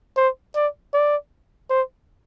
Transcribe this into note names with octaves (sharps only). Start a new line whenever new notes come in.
C5
D5
D5
C5